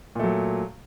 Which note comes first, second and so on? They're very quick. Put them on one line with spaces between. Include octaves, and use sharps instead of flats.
A#2 A3 F#3